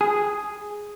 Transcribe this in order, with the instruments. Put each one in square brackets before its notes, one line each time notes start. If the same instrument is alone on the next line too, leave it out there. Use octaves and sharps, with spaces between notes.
[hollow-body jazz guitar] G#4